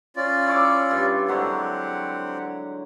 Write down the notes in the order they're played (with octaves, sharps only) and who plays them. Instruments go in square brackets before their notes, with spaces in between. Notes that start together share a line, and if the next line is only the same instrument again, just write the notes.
[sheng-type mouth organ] C#4 F4 D5
[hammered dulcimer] E4 C#5 D6
G2
[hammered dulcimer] D3 F#3 G#3 [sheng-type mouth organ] C4 G4 F#5